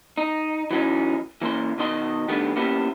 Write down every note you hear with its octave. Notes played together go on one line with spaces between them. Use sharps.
D#4
E3 F#3 C4 C#4 D#4
E3 A#3 C#4 C6
B2 D#3 D#5 C6
D#3 G3 A3 B3 D4
A#3 B3 C#4 E4 G4